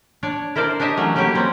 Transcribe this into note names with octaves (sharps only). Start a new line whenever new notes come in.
D4 C#5 D5
E4 A#4 C5 D5 F5
D4 G4 C#5 D#5 E5
E3 F#3 A3 C#4
F#3 G3 A#3 C#4 G4 C#5
C4 C#4 F#5